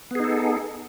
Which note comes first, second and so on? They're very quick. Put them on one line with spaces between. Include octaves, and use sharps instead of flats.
B3 G#4 D#4 A4